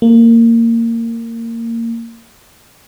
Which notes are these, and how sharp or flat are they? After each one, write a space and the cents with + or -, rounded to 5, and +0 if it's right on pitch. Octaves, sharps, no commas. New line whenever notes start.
A#3 -20